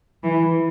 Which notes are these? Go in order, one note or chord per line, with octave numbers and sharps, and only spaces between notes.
E3